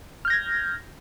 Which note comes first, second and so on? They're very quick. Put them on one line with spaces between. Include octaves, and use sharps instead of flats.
F6 G6 A#6 G#6